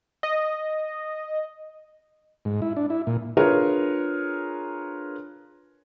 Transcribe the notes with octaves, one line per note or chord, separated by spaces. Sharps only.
D#5
G#2
E4
D4
E4
A#2
D4 F4 G#4 A#4 B4 C#5